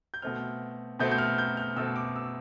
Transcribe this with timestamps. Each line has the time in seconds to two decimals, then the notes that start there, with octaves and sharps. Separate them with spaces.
0.14 G6
0.22 B2 A3 C4 F6
1.00 B2 A3 C4 G6
1.12 G6
1.18 F6
1.38 G6
1.57 F6
1.76 B2 A3 C4 E6
1.96 D6
2.16 E6